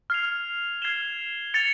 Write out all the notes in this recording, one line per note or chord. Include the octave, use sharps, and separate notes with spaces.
F6 G#6 C7 F7
F6 G#6 C7 E7 G7
A6 C#7 F7